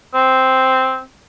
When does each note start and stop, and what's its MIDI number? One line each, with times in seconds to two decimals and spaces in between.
0.14 1.01 60